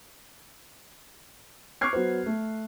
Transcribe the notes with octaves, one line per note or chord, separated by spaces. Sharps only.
C#6 D6 F6 F#6 G#6 C7
F#3 B3 C5
A3